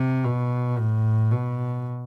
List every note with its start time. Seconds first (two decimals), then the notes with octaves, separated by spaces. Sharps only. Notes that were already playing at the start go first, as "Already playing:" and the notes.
Already playing: C3
0.25 B2
0.78 A2
1.31 B2